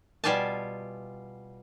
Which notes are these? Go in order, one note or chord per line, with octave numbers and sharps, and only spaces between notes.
B2 G3 F4 D5 G#5 A5